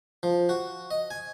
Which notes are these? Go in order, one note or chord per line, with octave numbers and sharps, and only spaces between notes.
F3
F#4
D#5
G#5